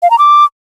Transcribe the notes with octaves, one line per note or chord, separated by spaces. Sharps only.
F5
A#5
D6